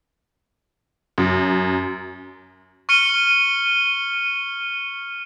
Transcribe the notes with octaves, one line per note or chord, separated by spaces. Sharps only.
F#2
C#6 F6 C#7 D#7 G7